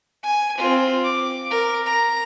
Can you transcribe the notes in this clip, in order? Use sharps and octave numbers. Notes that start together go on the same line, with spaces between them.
G#5
C4 F4
D6
A#4
A#5